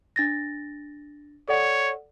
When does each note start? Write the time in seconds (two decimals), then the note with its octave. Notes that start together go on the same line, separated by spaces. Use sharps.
0.16 D4 A6 A#6
1.48 A4 C#5 D5 F#5